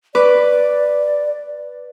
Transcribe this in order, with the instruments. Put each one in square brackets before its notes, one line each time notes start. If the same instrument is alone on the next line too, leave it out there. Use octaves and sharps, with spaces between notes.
[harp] B4 D6 [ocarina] D5